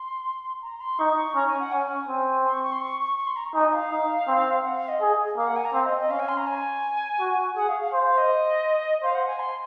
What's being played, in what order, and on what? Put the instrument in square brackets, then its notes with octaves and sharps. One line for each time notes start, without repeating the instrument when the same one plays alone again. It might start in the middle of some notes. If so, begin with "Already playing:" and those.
Already playing: [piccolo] C6
A#5
C6
[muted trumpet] D#4 [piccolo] C#6
[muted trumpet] C#4 [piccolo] A#5
[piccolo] G#5
F#5
[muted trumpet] C#4 [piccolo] G#5
[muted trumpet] C4
[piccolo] C6
C#6
C#6
C6
C#6
C#6
C#6
C6
A#5
[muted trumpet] D#4 [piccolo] G#5
[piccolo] F5
[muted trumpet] D#4
C4
[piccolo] F#5
F5
D#5
[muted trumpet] G#4
[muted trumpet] A#3 [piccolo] F5
[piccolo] F#5
G#5
A#5
[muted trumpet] C4 [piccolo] F5
[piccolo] D#5
D#5
[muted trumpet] C#4 [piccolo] F5
[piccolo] G#5
C6
A#5
G#5
[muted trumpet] F#4
[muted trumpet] G#4 [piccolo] F#5
[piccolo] F5
F5
[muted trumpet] C5 [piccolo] F5
[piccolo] F5
D#5
[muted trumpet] C5 [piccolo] F5
[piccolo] F#5
G#5
C6